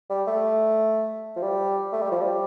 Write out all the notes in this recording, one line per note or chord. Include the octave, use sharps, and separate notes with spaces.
G3
A3
F3
G3
A3
G3
F3
G3